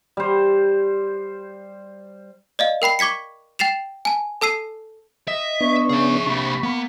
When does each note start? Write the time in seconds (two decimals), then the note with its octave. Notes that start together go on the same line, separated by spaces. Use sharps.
0.17 G3 C5
2.59 D5 D#5 F5
2.82 A#4 G5 B5 C7
2.99 C#6 D6 G#6 B6 C#7
3.59 G5 A6 C7 E7 F7
4.05 G#5 A5
4.41 A4 A5 E6 C7 D#7
5.28 D#5 E5
5.61 B3 D4 C#6
5.89 C#3 G#4 E5
6.27 C3 A#3 D4 B5
6.63 A#3 B3